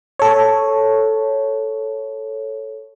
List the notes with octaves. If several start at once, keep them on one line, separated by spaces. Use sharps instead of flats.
A4 C#5